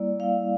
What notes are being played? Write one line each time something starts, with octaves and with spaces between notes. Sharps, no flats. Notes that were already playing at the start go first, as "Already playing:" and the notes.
Already playing: G3 A#3 E4 D5
G3 A#3 E4 F5